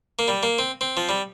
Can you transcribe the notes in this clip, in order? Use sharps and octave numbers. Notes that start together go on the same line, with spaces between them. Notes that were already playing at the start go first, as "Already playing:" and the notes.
A#3
G3
A#3
C4
C4
F3
G3